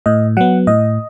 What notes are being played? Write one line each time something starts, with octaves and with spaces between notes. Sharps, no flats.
A2 D#5
F#3 B3 F#5
A2 D#5